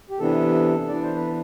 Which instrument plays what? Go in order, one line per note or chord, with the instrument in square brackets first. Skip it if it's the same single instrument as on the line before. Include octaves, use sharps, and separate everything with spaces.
[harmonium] G4
C3 E3 B3 D4 A4
E3 B3 D4 D5
C5
B4